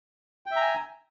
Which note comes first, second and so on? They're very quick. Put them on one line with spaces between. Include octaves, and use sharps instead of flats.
G5 E5 A#5 G#5